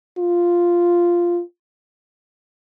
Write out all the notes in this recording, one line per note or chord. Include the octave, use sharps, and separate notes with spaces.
F4